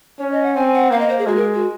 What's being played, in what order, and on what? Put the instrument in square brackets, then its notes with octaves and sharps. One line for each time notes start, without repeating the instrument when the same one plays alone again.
[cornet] C#4 [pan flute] C#5
[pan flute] D#5
F#5
[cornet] C4 [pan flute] G#5
[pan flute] F#5
[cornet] A#3 [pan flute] F5
[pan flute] D#5
C5
G#4
[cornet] G#3 [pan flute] F#4
[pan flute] A#4
F#4